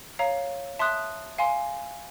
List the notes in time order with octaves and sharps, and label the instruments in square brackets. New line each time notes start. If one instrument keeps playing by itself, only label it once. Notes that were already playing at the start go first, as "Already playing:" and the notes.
[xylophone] C#5 F5 A#5
E5 A5 C6 D#6 F#6
F5 G#5 C6